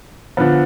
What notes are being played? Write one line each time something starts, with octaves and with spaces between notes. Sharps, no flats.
D3 F3 B3